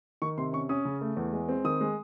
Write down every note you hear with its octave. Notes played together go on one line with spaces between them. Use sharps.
D#3 C#6
C3 C6
C#4 C#6
C#4 D#6
C#3
A3
E2
G#3
C4
D#3 D#6
G#3